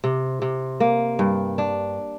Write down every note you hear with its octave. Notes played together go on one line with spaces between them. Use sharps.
C3
C3
A#3
G2
D4